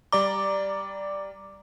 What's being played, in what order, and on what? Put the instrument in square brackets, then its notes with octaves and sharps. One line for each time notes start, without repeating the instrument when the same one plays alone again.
[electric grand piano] G3 D5 A#5 [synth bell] D6